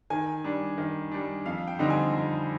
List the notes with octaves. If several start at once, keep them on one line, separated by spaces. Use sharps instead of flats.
D#3 G#5
G3 D4
D#3
G3 D4
F2 F5
G5
D3 G3 C4 D#4
G#5
F2